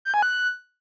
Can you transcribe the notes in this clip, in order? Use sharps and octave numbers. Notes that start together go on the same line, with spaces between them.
G6
G#5
F#6